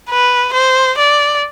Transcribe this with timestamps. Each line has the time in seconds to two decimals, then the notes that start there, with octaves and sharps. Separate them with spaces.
0.10 B4
0.54 C5
0.98 D5